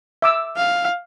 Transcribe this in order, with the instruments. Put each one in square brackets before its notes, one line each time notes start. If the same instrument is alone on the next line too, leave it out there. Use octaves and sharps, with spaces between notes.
[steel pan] E5 D6 E6
[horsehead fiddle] F5